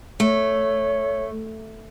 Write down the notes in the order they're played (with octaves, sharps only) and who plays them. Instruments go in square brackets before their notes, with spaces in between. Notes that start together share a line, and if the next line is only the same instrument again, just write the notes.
[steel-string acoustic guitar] A3 [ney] C#5